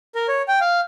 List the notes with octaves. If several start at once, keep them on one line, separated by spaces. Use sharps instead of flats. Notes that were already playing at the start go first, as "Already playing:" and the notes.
A#4
C#5
G5
F5